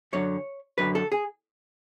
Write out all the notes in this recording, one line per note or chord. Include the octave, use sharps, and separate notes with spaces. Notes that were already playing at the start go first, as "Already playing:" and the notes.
F#2 D3 F#3 C#5
F#2 D3 F#3 B4
A4
G#4